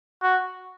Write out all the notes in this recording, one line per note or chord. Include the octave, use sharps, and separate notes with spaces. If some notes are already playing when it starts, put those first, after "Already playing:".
F#4